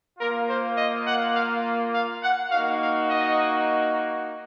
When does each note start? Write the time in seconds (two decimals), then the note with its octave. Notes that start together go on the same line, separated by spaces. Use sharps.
0.19 A#3 F4 A#4
0.48 C5
0.77 D#5
1.06 F#5
1.35 F5
1.93 F5
2.23 F#5
2.51 A#3 D#4 F#4 F5
2.80 F5
3.09 D#5